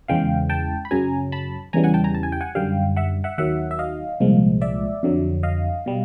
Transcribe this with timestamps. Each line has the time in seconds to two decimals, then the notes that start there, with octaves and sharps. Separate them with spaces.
0.08 E2 C#3 E3 G#3 F5 G5
0.50 G5 A5
0.85 B5
0.91 F#2 C#3 F#3 G#5 A#5
1.32 A5 B5
1.73 E2 C#3 E3 G3 G#5 A#5
1.84 F#5 G#5
1.94 G5 A5
2.04 G#5 A#5
2.15 A5
2.23 G#5
2.32 G5
2.41 F#5 G#5
2.55 F#2 D3 G3 F5 G5
2.97 E5 F#5
3.24 E5 F#5
3.38 D#2 D#3 F#3 E5 F#5
3.71 E5
3.79 D#5 F5
4.20 C2 A#2 F3 G#3
4.61 D5 E5
5.03 F2 D3 F#3
5.43 D#5 F5
5.86 B2 G3